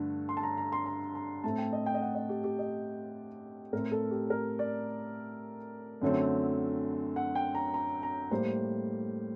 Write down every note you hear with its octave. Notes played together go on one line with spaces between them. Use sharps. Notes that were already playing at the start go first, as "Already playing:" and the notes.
Already playing: G2 D3 A3
C6
A5
A#5
A#5
C6
A#5
A#5
A2 A3 C4 A5
G5
D#5
G5
D#5
F#5
D#5
G4
G4
D#5
A2 A3 C4 A#4
A4
G4
A#4
D5
F#2 D3 F#3 A3 C4
F#5
G5
A#5
A#5
A#5
A2 G3 A#3 C5